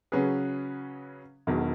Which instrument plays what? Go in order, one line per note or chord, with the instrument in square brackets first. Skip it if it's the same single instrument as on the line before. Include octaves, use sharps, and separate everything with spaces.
[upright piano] C#3 F#3 C#4 G#4 B4
E1 E2 D#3 F#3